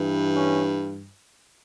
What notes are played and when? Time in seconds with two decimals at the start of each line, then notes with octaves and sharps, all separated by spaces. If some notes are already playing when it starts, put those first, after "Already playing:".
Already playing: G2 E3
0.36 C#4